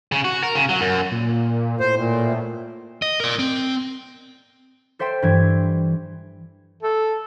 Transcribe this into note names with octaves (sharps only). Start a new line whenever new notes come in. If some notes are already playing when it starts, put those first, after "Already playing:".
C#3
F#4
A#4
C#3
F#3
F#2
A#2
A2 C5
A#2
D#5
A#4 D5
C4
A4 C5 E5 G5 C6
G2 E3 G#6
A4